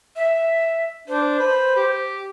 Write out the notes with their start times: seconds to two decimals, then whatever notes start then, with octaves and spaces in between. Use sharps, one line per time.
0.16 E5
1.08 D4 C5
1.39 B4
1.76 G4